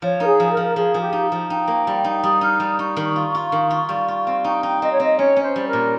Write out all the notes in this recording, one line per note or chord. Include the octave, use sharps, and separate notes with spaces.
F3 C#5
D#4 A#4
G#4
F3
A#4
F3
F3 G#4
F3
G4
D#4
F3
D#4 G5
A#3
G3
D#4
G3 D#6
D#4 F6
G3 D#6
D#4 C#6
D#3
F4
F4
D#3
F4
G3
F4
C4
D#4 G5
D#4
C4 D#5
C#5
C4 D#5
C#4 C#5
C#4
C5
G3
A#4
A#2